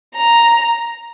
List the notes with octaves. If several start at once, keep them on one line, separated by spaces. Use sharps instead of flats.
A#5